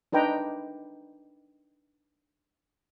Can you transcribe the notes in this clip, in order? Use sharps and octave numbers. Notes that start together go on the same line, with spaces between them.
D4 D#4 B4 G5 A#5